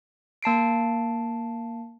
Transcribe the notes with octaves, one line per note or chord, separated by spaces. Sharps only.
A#3 A5 C7 D7